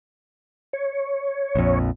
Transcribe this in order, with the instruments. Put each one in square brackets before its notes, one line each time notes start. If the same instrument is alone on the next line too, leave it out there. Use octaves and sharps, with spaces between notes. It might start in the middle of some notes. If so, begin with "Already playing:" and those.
[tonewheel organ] C#5
[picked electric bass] A#1 F2